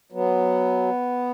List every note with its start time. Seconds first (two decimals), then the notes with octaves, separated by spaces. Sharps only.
0.12 F#3 B3